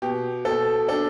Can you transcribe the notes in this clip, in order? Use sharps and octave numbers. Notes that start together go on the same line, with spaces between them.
B2 G4
B2 A4
D4 A4